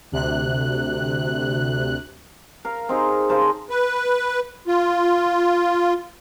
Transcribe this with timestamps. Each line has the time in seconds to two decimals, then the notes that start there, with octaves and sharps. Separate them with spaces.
0.12 D2 C3 F#6
2.65 A#4 F5
2.89 C4 D#4 G#4
3.29 C#3 A#4 C5 A5
3.70 B4
4.67 F4